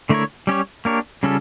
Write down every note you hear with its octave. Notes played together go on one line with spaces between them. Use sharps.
D3 A3 E4 A#4 C#5
G3 C#4 G4 C#5
A#3 D4 G4 A#4 C#5
C#3 G3 C#4 F4 A4